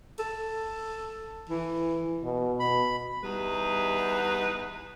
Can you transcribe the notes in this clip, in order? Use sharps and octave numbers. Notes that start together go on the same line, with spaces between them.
A4
E3
B2
B2 B5
E2 G3 D#4 B4